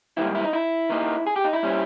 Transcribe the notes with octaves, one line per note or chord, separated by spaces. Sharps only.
G#2 D#3 G3 A#3 E4
E4
D#4
E4
D#3 A#3 D#4
G#4
G4
D#4
E4
A#2 G3 C#4